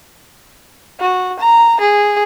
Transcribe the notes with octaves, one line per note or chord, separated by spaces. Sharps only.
F#4
A#5
G#4